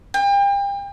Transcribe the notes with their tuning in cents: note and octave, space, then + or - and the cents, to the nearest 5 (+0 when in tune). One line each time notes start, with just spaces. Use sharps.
G5 +35